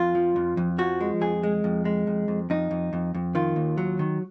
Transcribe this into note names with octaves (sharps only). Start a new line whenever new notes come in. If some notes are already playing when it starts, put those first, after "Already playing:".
Already playing: F2 F4
F3
F2
F2
F3 F#4
G#3
F2 G#4
G#3
F2
G#3
F2
F2
F2 D#4
F2
F2
F2
D#3 F4
D#2
F#3
D#3